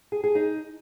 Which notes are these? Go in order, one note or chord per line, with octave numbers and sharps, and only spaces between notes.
G#4
G#4
D#4